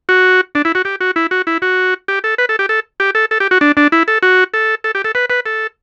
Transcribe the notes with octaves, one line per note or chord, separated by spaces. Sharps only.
F#4
D4
E4
F#4
G4
F#4
E4
F#4
E4
F#4
G4
A4
B4
A4
G4
A4
G4
A4
A4
G4
F#4
D4
D4
E4
A4
F#4
A4
A4
G4
A4
B4
B4
A4